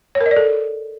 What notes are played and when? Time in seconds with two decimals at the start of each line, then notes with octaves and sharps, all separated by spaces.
0.15 C#5
0.21 A#4
0.26 D#5
0.31 D5
0.37 A4